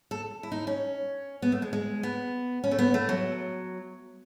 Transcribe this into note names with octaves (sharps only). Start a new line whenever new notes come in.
A4
E4
D#4
C#4
B3
A3
G#3
G#3
B3
C#4
A3
B3
A3
F#3